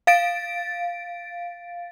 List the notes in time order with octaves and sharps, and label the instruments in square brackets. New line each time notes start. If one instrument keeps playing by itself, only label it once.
[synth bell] F5 A6 D7